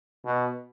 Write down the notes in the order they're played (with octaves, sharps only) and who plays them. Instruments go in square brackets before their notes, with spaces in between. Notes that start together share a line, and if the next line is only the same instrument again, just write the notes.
[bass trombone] B2